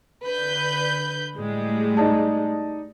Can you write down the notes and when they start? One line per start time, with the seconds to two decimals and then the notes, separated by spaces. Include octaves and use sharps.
0.24 D3 B4 G6
1.37 A2 G3 G#3
1.97 D#4 D5 A5